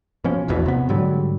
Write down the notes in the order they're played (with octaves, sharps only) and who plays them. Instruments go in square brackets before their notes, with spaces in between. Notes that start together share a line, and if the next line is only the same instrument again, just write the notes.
[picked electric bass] B2 F3 C#4
E1 A#1 E2 B2
C3 B3
G#2 D3 F#3 G3